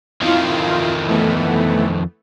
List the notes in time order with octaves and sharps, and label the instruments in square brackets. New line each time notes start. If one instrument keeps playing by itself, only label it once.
[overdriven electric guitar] F2 D#3 [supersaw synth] E4 F4 F5
[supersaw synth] E3 A3 B3